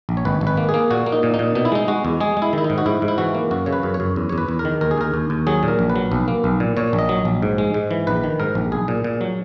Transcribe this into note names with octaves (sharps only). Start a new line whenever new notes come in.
A#1
C#5
G#1 B4
G#1
B4
A#3
G#4
A#3
A#2 F#4
A#3
D#4
A#2
D#4
A#2
B2 D#4
E4
G#3 D#4
G#3 F#4
E2
G#3 G#4
G#3
E4
D#3 E4
D#4
G#2
F#4
G#2 E4
G#2
E4
E3 F#4
A#3
F#2 F#4
C#3 C#5
B4
F#2
C#5
F#2
E2
E2 C#5
B4
E2
A#4
D#3
D#2 A#4
G#4
D#2 A#4
D#2
D#2
F#3 G#4
A#2
A#4
A#1
B4
F#3
B1
A#3
B1
A#2
A#2 C#5
A#1
D#5
F#3
A#1
G#2
G#3
G#2
E3
A#1 B4
D#3
G#2 A#4
A#1
B1 G#4
A#2
A#2
F#3